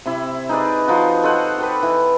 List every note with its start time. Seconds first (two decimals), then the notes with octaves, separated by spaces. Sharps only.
0.06 C3 E4
0.49 D#4 G#4 B4 D5
0.88 F3 D#4 F#4
1.23 A4 C5 D#5 F#5
1.58 G4 A4 B4
1.83 E3